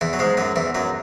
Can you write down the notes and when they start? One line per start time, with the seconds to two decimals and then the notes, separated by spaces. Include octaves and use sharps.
0.01 E2 E3
0.13 F#3
0.19 G#2 G#3
0.37 F#2 F#3
0.56 E2 E3
0.75 F#2 F#3